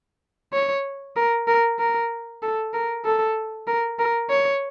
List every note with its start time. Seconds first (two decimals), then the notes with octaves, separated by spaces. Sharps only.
0.53 C#5
1.16 A#4
1.47 A#4
1.79 A#4
2.42 A4
2.74 A#4
3.05 A4
3.67 A#4
3.99 A#4
4.30 C#5